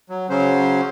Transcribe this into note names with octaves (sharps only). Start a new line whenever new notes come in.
F#3
C#3 F#3 C#4 C5